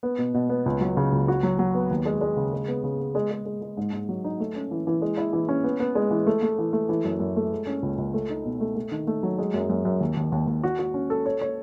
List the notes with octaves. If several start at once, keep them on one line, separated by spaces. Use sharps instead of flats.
B3
B2
B2
B3
C#2
F#3
C#3
C#2
F#4
F#3
F#3
B3
D#2
G#3
G#3
C#3
G#3
B3
C#3
B3
G#3
G#3
G#3
G#3
G#2
G#2
F#3
D#4
A3
C#4
E3
E3
G#3
E4
E3
C#4
B3
B3
G#3
E3
A3
A3
E3
A3
E3
F#2
F#2
A3
G#3
C#4
C#2
C#2
A3
D#4
B2
A3
A3
D#3
A3
F#3
G#3
F#2
F#2
F#2
D#2
D#2
D#2
D#2
F#4
F#4
C#4
A4
C#5
C#5